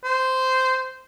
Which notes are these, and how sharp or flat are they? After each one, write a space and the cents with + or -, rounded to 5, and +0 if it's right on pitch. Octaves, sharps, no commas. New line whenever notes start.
C5 -10